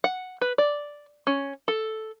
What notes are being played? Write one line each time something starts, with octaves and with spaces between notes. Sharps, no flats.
F#5
B4
D5
C#4
A4